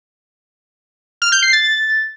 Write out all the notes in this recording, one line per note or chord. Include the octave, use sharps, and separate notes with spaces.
F6
G6
C7
A6